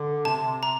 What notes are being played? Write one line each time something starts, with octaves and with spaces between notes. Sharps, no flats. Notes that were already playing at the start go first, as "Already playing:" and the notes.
Already playing: D3
C3 A5
A#5